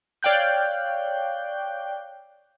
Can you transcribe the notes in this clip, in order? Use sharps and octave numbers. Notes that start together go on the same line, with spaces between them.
C#5 D5 F5 G5 F#6 G6